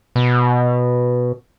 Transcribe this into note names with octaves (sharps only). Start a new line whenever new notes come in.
B2